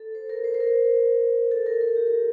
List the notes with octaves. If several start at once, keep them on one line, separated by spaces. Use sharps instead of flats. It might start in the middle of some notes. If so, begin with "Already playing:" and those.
Already playing: A4
C5
A#4
C5
C5
A#4
A4
A#4
A#4
G4